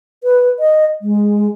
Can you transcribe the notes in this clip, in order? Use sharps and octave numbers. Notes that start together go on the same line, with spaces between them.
B4
D#5
G#3